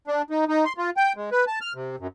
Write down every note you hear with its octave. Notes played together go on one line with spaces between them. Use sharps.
D4
D#4
D#4
C6
F4
G5
G#3
B4
A5
F6
C3
F#2